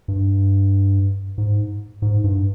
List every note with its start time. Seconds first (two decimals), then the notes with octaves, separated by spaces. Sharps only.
0.08 G2
1.38 G#2
2.02 G#2
2.24 G2